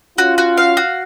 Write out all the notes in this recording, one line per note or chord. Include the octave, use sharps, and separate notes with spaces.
C#4 F4 F#4
F#4
F5
F#4